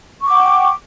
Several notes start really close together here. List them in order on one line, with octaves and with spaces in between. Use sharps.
C#6 D6 F#5 G5